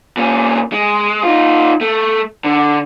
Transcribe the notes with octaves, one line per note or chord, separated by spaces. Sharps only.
A#2 C#4
G#3
D#4 F4
A3
D3